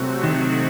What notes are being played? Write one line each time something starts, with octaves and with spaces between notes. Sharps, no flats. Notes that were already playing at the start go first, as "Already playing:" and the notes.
Already playing: C3 F#3 A3 C4 F#4
D#3